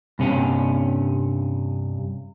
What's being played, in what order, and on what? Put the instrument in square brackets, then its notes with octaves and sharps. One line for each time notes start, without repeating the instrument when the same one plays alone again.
[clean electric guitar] G2 C3 C#4